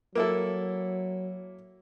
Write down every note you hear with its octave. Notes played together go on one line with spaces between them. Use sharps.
F#3 A#3 E4 A4